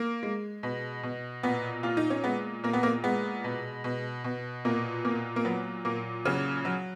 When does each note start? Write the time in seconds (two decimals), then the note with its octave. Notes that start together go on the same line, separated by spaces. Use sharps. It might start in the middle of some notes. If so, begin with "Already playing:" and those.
Already playing: A#3
0.23 G#3
0.63 B2
1.03 B2
1.43 A#2 B3
1.83 A#2 F4
1.97 D#4
2.10 C#4
2.24 G#3 B3
2.63 A#2 A#3
2.73 B3
2.83 A#3
3.04 G#3 B3
3.44 B2
3.84 B2
4.24 B2
4.65 A#2 A#3
5.05 A#2 A#3
5.36 A#3
5.45 F#3 B3
5.85 A#2 A#3
6.25 C#3 F#3 C#4
6.65 F#3